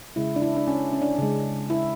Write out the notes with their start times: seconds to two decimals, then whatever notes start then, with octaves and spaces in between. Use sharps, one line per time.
0.16 C#3 G#3 E4
0.36 D4
0.42 E4
0.57 D4
0.68 C#4
0.93 C#4
1.02 D4
1.18 C#3 G#3
1.70 E4